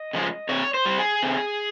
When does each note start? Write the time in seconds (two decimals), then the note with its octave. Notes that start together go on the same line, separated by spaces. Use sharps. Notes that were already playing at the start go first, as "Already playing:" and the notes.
Already playing: D#5
0.13 C#3 F3 G#3
0.49 C3 C#5
0.74 C5
0.85 G3
0.98 G#4
1.23 C3